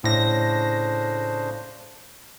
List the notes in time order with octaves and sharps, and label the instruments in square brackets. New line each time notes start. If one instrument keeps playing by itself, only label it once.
[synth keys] A2 A#6 [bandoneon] C#3 D4 C5